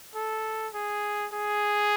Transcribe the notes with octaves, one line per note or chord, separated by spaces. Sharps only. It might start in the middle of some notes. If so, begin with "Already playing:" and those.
A4
G#4
G#4